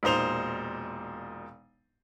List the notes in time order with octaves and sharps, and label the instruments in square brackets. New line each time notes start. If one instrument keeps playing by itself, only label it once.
[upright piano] E1 A#2 D#4 C5 F7